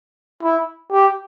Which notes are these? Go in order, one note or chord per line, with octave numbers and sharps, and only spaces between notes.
E4
G4